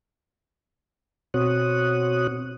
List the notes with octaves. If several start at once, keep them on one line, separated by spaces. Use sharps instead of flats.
B2 C4 F#4 C#5 D#6 F#6